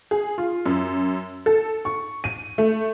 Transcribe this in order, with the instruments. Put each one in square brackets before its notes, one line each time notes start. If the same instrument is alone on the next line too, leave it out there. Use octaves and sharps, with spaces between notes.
[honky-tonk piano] G#4
F4
F#2
A4
C#6
D#7
A3